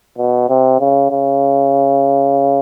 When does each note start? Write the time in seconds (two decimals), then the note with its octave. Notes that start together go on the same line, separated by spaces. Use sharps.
0.18 B2
0.49 C3
0.80 C#3
1.10 C#3